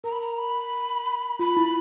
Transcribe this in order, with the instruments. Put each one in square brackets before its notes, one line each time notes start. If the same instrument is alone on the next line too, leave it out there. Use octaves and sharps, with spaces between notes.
[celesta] A#4 [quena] A#5
[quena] B5
A#5
B5
[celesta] F4 [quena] B5
[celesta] E4